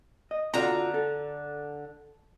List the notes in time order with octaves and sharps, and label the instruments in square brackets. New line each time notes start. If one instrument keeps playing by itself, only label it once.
[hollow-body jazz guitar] D#5
[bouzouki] D3 A#5 [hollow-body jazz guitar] C4 F4 F#4
[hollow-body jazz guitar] A4